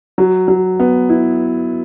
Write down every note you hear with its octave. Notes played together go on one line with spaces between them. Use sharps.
F#3
F#3
B3
E4